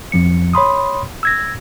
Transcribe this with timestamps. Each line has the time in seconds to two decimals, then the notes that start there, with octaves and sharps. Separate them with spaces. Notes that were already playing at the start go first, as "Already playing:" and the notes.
0.12 F2 F3 C#7
0.53 C#5 B5 C6 D#6
1.23 E6 G#6 A#6